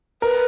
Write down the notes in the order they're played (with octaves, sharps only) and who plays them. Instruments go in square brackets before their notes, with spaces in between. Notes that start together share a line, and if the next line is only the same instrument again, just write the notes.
[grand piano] A#4 [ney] B4